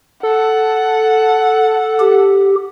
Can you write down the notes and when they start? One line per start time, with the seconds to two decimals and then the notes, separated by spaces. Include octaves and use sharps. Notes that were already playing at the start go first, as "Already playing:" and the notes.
0.23 A4 F#5
2.00 G4